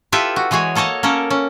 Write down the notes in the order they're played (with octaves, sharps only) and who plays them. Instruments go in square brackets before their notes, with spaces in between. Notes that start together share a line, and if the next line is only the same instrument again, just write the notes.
[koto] E4 F4 G4 A4 B4 E5
F#4
E3 G#3 F#4 G#4 C#5
A#3 A4 C#5 D#5 A5
A#3 C#4 A4 A#4
C#4